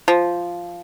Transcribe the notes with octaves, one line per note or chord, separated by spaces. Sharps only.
F3